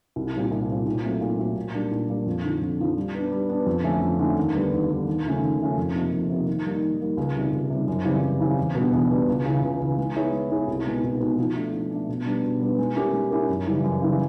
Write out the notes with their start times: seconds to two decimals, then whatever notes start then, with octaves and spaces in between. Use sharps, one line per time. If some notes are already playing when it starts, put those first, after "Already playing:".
0.16 C2
0.34 A#2 G3 C4
0.51 C2
0.69 A#2 G3 C4
0.86 A#2
1.03 F#3 A3 C4
1.21 A#2
1.38 F#3 A3 C4
1.56 A#2
1.74 G3 A#3 D4
1.91 A#2
2.09 G3 A#3 D4
2.26 F2
2.44 D3 F3
2.62 F2
2.79 D3 F3
2.97 G3
3.14 B3 D4
3.32 G3
3.49 B3 D4
3.66 F2
3.84 D3 F3 A3 C#4
4.02 F2
4.19 D3 F3 A3 C#4
4.37 D#2
4.54 D3 G3 B3
4.72 D#2
4.90 D3 G3 B3
5.07 D#2
5.25 C#3 F3 A3 C#4
5.42 D#2
5.60 C#3 F3 A3 C#4
5.78 F2
5.94 C3 F3 A#3 D#4
6.13 F2
6.30 C3 F3 A#3 D#4
6.47 D#3
6.64 G3 A#3 D#4
6.82 D#3
7.00 G3 A#3 D#4
7.17 C#2
7.35 C3 D#3 G3
7.52 C#2
7.70 C3 D#3 G3
7.88 F#2
8.05 C#3 E3 G3 C4
8.23 F#2
8.40 C#3 E3 G3 C4
8.58 E2
8.75 B2 G3 B3 D4
8.93 E2
9.10 B2 G3 B3 D4
9.28 C#2
9.45 C#3 E3
9.63 C#2
9.80 C#3 E3
9.98 G#3
10.15 B3 E4 G#4 C#5
10.33 G#3
10.51 B3 E4 G#4 C#5
10.68 C2
10.86 B2 G#3 B3 D#4
11.04 C2
11.21 B2 G#3 B3 D#4
11.38 F3
11.56 A3 D4
11.73 F3
11.91 A3 D4
12.08 B2
12.26 G3 B3 D4
12.43 B2
12.61 G3 B3 D4
12.78 G#3
12.97 C#4 E4 G4 A#4
13.13 G#3
13.31 C#4 E4 G4 A#4
13.49 F#2
13.66 C#3 E3 G3
13.84 F#2
14.01 C#3 E3 G3